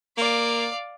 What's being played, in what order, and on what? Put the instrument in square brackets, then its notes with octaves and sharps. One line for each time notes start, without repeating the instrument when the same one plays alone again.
[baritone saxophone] A#3 [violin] D5 F5